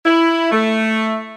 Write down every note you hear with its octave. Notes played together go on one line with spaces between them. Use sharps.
E4
A3